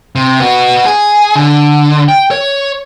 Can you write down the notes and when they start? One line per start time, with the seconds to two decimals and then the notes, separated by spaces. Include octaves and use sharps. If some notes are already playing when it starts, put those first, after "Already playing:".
0.15 C3
0.40 B3 F#4
0.85 G#4
1.36 D3
2.09 G5
2.31 C#5